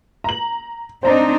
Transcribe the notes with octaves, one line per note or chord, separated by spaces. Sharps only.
A#5 F#7
C4 D4 D#4 C5 A#5